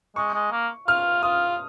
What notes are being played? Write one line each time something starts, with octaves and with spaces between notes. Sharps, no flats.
G#3 C#6
G#3
A#3
F4 F6
F4 D#6